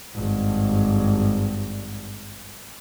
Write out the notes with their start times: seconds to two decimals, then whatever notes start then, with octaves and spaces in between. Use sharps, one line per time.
0.15 G#1 G2